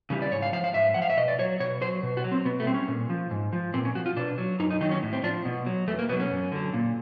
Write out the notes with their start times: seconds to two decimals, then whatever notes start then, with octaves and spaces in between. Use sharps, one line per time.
0.10 C#3 E3 G3
0.22 D5
0.31 G#2 C#5
0.42 F5
0.53 F3 F5
0.64 F5
0.74 G#2 E5
0.94 F3 F#5
1.02 F5
1.10 E5
1.17 B2 D#5
1.28 D5
1.39 F#3 C#5
1.60 B2 C#5
1.81 F#3 C5
2.03 B2
2.17 F#4
2.24 F#3
2.32 C4
2.45 B2 B3
2.60 A3
2.67 G3 C4
2.74 C#4
2.88 A#2
3.10 F3
3.31 G#2
3.53 F3
3.74 A#2 C4
3.85 C#4
3.95 F3 F#4
4.06 F4
4.17 B2 D4
4.38 F#3
4.60 F#2 D#4
4.70 D#4
4.81 D#3 F#3 D#4
4.91 C#4
5.02 A2
5.13 C4
5.24 F3 D4
5.45 B2
5.66 F#3
5.88 E2 A3
5.99 A#3
6.09 B2 B3
6.12 F#3
6.20 C#4
6.31 F#2
6.52 D3 F#3
6.74 A#2